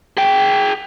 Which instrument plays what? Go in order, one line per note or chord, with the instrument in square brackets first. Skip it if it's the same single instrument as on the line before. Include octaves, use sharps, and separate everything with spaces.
[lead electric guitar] G#4 G5